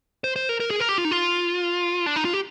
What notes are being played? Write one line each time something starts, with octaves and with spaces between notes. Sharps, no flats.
C5
C5
A#4
A#4
G#4
A#4
G4
F4
D#4
F4
D4
D#4
F4
G4